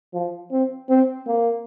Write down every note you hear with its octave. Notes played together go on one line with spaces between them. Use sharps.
F3
C4
C4
A#3